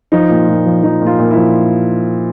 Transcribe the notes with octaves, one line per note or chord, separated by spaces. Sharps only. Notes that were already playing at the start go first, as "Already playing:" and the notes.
F3 D#4
A#2
A#2
F3
F3 D#4
A#2 F4
A#2
E4
F3